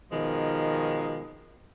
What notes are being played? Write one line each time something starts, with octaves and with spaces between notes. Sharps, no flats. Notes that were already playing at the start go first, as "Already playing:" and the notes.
B2 D#3 F3 G#3